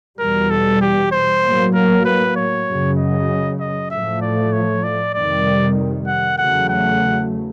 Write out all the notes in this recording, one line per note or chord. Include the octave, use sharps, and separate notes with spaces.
E2 B2 G3 A#4
A4
G4
C5
A2 F#3 A#3
A#4
B4
C#5
F#2 C#3 F#3
D#5
D#5
A2 F3 A3 E5
D5
C#5
D5
F2 C3 D#3 G3 D5
F#5
E2 C#3 F#3 A3 F#5
F#5